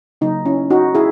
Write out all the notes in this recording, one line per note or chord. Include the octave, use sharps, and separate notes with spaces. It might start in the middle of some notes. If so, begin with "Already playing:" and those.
C#3 F#3 A#3 D#4
C#4 E4
D#4 F#4
E4 G#4